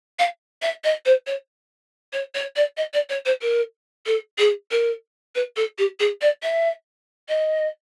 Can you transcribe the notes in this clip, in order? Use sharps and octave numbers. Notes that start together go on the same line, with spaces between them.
F5
E5
D#5
C5
C#5
C#5
C#5
D5
D#5
D5
C#5
C5
A#4
A4
G#4
A#4
B4
A4
G4
G#4
D5
E5
D#5